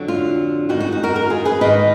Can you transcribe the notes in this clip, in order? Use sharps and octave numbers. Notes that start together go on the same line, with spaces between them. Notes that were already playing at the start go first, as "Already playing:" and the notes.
Already playing: F2 D3 F#3 D4
F4
F#2 D#3 G#3 D#4 F#4
F#4
F#4
F#4 A#4
F#4 A#4
F4 G#4
G#4 B4
G#2 D#3 A#3 D#4 B4 D#5